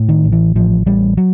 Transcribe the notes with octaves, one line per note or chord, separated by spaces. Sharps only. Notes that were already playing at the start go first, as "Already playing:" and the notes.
Already playing: A2
D#3
A1
E3
A1 F3
A1 G3
F#3